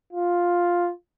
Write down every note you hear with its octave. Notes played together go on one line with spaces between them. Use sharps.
F4